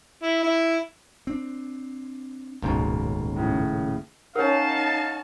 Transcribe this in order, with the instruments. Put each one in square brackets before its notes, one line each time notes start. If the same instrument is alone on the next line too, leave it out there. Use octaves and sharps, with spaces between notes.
[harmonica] E4
E4
[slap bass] C4 D4
[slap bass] D#1 A#3 [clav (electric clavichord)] C#2 G#2 B2
[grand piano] A2 C#3
[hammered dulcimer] C#4 F#5 [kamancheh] D#4 A5 [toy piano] A#4 C#5 [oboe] F5